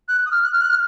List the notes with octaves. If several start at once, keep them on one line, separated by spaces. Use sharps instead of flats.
F#6
D#6
F6
F#6
F6
F#6
F6